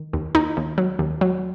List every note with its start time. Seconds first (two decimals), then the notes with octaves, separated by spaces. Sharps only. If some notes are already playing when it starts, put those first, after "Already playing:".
Already playing: D#3
0.13 D#2
0.35 D#2 D#4
0.57 D#2
0.78 F#3
0.99 D#2
1.21 F#3